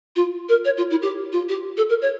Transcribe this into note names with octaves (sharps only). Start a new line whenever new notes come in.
F4
A#4
C#5
F4
E4
G4
F4
G4
A4
A#4
C#5